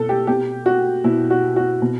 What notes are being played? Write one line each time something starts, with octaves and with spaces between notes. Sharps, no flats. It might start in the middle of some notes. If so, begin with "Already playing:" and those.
Already playing: B2 A4
G4
B2 G4
F#4
B2 E4
F#4
F#4
B2